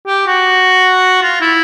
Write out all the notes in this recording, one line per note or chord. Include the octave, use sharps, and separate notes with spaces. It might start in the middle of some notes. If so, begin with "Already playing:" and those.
G4
F#4
F4
E4